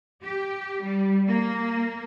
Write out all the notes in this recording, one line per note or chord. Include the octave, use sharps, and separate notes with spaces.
G4
G3
A#3